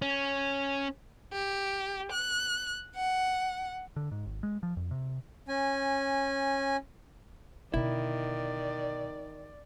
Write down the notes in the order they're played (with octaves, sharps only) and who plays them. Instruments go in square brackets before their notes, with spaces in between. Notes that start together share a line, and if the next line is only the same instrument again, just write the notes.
[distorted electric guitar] C#4
[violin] G4
F#6
F#5
[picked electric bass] D3
G#2
G#1
G#3
F3
F2
C3
[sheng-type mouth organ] C#4 G#5
[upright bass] B2 D3 [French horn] D#3 [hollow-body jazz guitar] E4 [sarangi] D5